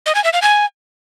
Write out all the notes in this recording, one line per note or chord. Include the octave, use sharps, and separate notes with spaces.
D#5
G#5
E5
F5
G#5